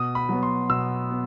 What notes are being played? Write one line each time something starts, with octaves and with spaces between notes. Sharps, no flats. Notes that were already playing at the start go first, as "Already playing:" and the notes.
Already playing: B2 D#6
B5
F#3 B3
C6
B2 E6
B3